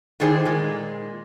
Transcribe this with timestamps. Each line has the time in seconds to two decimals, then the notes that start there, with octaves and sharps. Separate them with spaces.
0.20 A2 D3 D#3 G#4 C5
0.45 A#2 G#3